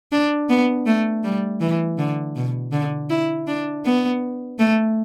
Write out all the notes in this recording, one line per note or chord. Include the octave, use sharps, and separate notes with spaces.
D4
B3
A3
G3
E3
D3
B2
D3
E4
D4
B3
A3